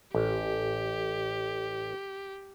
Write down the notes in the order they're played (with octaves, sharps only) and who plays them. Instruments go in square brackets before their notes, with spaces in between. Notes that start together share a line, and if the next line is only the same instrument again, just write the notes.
[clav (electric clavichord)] A1 [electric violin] G4